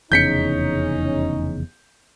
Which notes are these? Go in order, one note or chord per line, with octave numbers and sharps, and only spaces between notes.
F1 E2 C#3 C#4 D#4 G6 B6 C#7